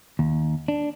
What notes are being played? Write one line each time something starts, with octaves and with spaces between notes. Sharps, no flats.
D#2
D4